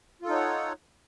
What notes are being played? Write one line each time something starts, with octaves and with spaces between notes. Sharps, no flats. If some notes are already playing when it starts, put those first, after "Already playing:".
D#4 F4 A4 C#5 F#5